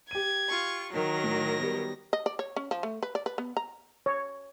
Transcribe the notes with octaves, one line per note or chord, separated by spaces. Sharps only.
G4 G#6 D#7
F4 C#6
D#3 F#3 A#4 A#6
A2
G3 B3
D#5
D5
C#5
C#4
F3
A3
B4
D5
B4
B3
A#5
C#5